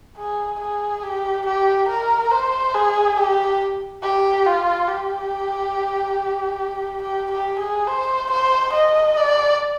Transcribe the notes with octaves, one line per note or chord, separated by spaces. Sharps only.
G#4
G#4
G4
G4
A#4
C5
G#4
G4
G4
F4
G4
G4
G4
G#4
C5
C5
D#5
D5